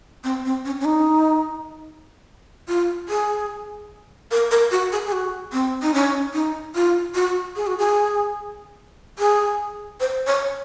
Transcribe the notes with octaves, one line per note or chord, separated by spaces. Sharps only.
C4
C4
C#4
C#4
D#4
F4
G#4
A#4
A#4
F#4
G#4
G#4
F#4
C4
D#4
C#4
D#4
F4
F#4
G#4
F#4
G#4
G#4
C5
C#5